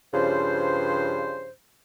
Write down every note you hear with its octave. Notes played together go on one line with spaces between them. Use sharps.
G2 C#3 F3 C5